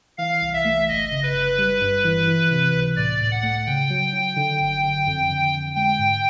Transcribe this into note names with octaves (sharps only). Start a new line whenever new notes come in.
E3 F5
C2
E5
A3
G1 D#5
C#3
B4
G1
G3
G2
E3
E3
C3
C#2
A2 D5
A2
F#5
A3
C#3 G5
F#3
F#3
D3
G1
D3
F2
D3
D3
G#3 G5
G#2